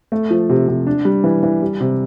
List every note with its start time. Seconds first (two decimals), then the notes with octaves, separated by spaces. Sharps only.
0.12 A3
0.30 F3
0.49 C3
0.68 C3
0.87 D4
1.05 G3
1.24 E3
1.43 E3
1.62 G3
1.80 C3